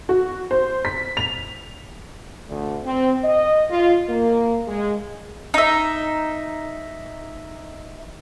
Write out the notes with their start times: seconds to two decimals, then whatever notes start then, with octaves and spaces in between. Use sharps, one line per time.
0.09 F#4
0.51 C5
0.85 B6
1.17 F7
2.49 D2
2.85 C4
3.24 D#5
3.71 F4
4.10 A#3
4.68 G#3
5.54 D#4 E5